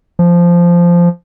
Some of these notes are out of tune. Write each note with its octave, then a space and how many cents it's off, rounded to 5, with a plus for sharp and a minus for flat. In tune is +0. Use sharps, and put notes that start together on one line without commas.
F3 -10